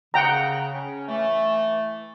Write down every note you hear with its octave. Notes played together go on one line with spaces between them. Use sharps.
C#3 F#5 G5 A#5
C#4
E3 A3